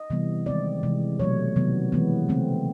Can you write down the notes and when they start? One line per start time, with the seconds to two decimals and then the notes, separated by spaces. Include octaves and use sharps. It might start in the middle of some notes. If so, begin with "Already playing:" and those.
Already playing: D#5
0.10 C3 E3 G3 B3
0.46 D#3 G#3 C4 D5
0.83 C3 E3 G#3
1.19 B2 F#3 A3 C#5
1.56 C3 D#3 F#3 B3
1.92 E3 G#3 B3
2.29 C#3 E3 A3 C4